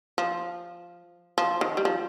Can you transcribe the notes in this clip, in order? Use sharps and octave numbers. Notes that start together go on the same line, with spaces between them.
F3
F3
D#3
G3
F3